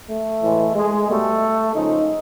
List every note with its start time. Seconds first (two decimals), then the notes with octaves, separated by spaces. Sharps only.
0.10 A3
0.43 A2 E3 G#3
0.76 G#3
1.08 B2 G3 A3
1.75 C#3 F3 G#3 D#4